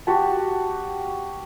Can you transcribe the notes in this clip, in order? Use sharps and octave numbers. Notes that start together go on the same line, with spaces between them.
F#4 G4 A5